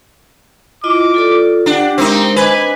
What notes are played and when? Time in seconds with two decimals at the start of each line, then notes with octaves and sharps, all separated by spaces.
0.84 E4 F4 D#5 D6
1.14 F4 A4 D5
1.66 D4 G4 D5 F#5
1.98 G#3 C4 D#4 A#4
2.36 D4 B4 D#5 G#5